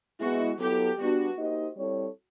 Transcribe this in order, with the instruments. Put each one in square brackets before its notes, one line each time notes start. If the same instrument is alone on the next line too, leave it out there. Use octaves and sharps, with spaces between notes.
[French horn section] G#3 B3 E4 [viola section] F#4
[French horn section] F#3 B3 E4 A4 [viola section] G4
[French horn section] G3 B3 D4 [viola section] F#4
[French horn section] A#3 D#4 G4 C5 D#5
G3 C4 E4 A4 C#5